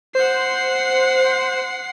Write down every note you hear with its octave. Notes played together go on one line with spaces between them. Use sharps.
C5 F#5 C7